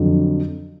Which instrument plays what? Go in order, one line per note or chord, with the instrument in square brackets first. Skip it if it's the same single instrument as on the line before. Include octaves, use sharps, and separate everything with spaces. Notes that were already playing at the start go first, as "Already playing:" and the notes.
Already playing: [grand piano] F2 D3 F#3